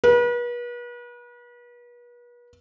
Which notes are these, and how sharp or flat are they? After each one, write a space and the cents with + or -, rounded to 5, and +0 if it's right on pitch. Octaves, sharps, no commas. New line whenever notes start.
B4 -40